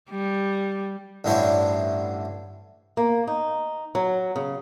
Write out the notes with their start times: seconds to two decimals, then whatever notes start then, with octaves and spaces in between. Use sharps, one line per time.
0.10 G3
1.24 A1 G2 D3 E4 C5 C#5
2.97 A#3
3.27 D#4
3.95 F#3
4.36 C#3